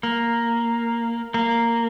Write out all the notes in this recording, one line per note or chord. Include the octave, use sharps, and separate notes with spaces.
A#3
A#3